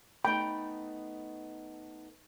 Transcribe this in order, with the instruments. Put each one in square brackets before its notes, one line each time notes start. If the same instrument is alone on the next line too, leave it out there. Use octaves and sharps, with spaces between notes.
[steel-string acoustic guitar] A3 B3 D#4 [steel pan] G5 [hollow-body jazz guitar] B5